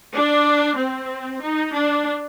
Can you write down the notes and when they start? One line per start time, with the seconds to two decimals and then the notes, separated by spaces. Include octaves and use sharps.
0.14 D4
0.78 C4
1.42 D#4
1.74 D4